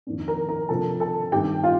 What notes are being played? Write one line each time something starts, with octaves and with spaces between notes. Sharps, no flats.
F2 D#3 A#3 D4
A#4 A#5
A#4 A#5
C3 F3 A#3 D4 A4 A5
A4 A5
G2 D#3 G3 G4 G5
F4 F5